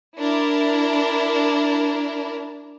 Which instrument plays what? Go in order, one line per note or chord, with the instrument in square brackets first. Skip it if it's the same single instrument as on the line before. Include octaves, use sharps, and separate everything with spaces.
[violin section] D4 E4 A#4